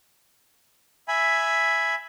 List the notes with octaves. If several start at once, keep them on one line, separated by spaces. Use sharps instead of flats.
E5 G#5 B5